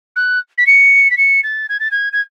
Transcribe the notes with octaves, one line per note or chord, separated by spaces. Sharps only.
F#6
B6
C#7
B6
C#7
A6
G#6
A6
G#6
G#6